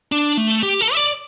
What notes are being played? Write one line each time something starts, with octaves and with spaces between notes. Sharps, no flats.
D4
A3
G4
A4
E5
D5